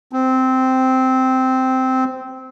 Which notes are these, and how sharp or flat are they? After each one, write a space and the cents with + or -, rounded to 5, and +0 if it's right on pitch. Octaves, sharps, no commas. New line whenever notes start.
C4 -10